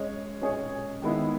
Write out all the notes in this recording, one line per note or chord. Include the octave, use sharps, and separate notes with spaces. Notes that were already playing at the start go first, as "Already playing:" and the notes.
Already playing: G#3 C#4 G#4 C#5
G#3 C#4 G#4 C#5
D#3 G#3 B3 E4